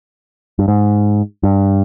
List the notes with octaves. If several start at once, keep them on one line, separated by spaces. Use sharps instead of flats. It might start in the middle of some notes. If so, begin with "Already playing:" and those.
G2
G#2
G2